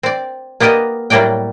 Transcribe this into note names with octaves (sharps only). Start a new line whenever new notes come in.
C4 D5
A#3 B3 G4 D5 D#5
A2 F#3 G3 A#3 D5 G5